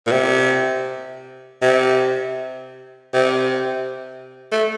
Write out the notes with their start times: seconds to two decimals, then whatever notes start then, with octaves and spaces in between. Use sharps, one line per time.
0.07 A#2
0.11 C3
1.62 C3
3.14 C3
4.52 A3